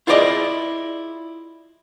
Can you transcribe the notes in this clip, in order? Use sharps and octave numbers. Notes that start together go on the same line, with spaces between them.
E4 F4 G#4 A4 D5 D#5